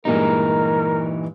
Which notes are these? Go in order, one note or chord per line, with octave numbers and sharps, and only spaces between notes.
G2 A#2 E3 G#3 D#4 A#4